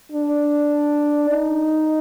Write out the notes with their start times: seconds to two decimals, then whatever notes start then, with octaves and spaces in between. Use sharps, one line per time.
0.12 D4
1.30 D#4